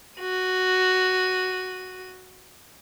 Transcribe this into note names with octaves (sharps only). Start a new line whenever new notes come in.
F#4 D#7